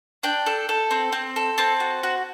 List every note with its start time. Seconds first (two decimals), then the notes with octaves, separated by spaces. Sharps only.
0.23 D4 G5
0.46 A4
0.69 A4
0.91 C4
1.12 C4
1.36 A4
1.58 C4 A5
1.80 F#4
2.03 F#4